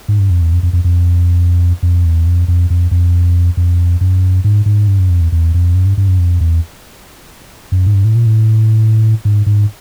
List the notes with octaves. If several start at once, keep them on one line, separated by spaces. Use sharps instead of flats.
G#2
G2
F2
E2
F2
F2
F2
F2
F2
E2
F2
F2
F2
F2
F2
F#2
G#2
G#2
G2
F#2
F2
E2
E2
F2
F#2
G2
G2
F#2
F2
E2
F#2
G#2
G2
A2
A#2
A2
G#2
G#2